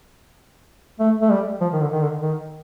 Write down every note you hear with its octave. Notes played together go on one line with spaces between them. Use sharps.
A3
A3
G3
F3
D#3
D3
D#3
D3
D#3